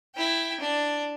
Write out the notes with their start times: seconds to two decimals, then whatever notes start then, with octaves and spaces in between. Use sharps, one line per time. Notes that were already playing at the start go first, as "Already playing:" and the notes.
0.15 E4 G5
0.60 D4